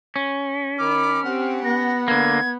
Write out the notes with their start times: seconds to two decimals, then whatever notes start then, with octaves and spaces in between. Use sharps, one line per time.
0.16 C#4
0.78 D#3 B5 D6 F6
1.25 C4 G4 F#5
1.64 B3 A#6
2.08 D3 A#3 G#6